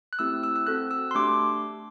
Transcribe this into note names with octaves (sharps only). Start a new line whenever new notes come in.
F#6
A3 C4 E4 G4 E6
E6
E6
C4 F#4 A4 F#6
E6
C6
A3 D4 G4 D6